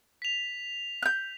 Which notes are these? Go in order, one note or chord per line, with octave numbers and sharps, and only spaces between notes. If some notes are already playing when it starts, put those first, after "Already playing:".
B6 F7
F#6 G6